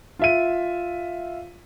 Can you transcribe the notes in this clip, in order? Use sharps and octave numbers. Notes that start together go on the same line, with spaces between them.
F4 E5 D#7